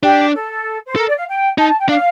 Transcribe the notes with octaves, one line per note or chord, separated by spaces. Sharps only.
D4 G4
A4
C5
A4 A#4
D5
F5
G5
D#4 A5
A5
G5
D4 F5